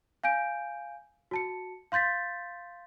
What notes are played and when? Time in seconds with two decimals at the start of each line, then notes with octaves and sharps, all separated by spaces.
0.24 F5 G#5 G6 D7
1.31 F#4 A5 C#7
1.92 F5 C6 G6 A6 B6